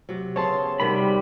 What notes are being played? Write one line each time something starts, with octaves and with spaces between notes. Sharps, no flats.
C3 F#3
C#3 B3 C4 C#5 A5 C6
C3 D#3 G3 F#4 B5